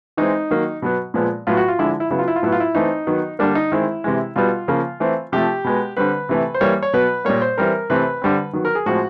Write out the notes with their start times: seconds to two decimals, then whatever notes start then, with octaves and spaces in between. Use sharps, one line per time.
0.17 E3 G#3 C4 D#4
0.51 D#3 F#3 A#3
0.82 B2 F#3 B3
1.14 A#2 F3 G#3 B3
1.47 A2 F#3 B3 F4
1.57 F#4
1.68 F4
1.79 D3 F3 G#3 E4
2.00 E4
2.10 C#3 F#3 B3 E4
2.19 F4
2.28 E4
2.36 F4
2.43 A2 F#3 B3 E4
2.52 F4
2.60 E4
2.75 E3 A3 C4 D#4
3.07 D#3 F#3 B3
3.39 D3 G3 A#3 D4
3.55 D#4
3.72 D#3 G#3 C4 E4
4.04 C3 E3 G#3
4.36 B2 G3 B3 F4
4.68 C#3 F3 A#3
5.00 E3 A3 C4
5.32 C3 F3 A3 G4
5.64 B2 G#3 B3
5.97 D3 G3 C4 B4
6.29 C3 E3 A3
6.54 C5
6.61 E3 G3 A#3 C#5
6.83 C#5
6.93 B2 F#3 B3 B4
7.25 A#2 G3 A#3 C#5
7.42 C5
7.58 E3 G3 C4 A#4
7.90 C3 E3 A3 C4 B4
8.22 D3 G3 C4
8.53 D#3 F#3 B3
8.65 A#4
8.75 G#4
8.86 A2 F3 G#3 C4 F#4